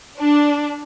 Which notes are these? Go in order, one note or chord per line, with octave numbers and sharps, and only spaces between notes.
D4